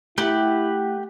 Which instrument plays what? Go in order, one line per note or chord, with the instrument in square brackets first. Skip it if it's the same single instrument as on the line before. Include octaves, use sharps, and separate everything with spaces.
[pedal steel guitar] A3 F#5 [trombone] E4 [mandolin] G4